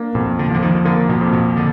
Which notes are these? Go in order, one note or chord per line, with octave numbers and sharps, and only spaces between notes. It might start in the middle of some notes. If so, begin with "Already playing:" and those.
Already playing: A#3 D4
F2 B2
D3
D3 F3
D#3
D3 A#3
B2
F2
B2
D3